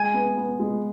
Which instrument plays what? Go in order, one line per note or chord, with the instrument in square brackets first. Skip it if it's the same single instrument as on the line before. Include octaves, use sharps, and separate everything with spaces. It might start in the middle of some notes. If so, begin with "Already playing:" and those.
Already playing: [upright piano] G#3 [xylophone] G#5 G#6
[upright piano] B3
B3
G#3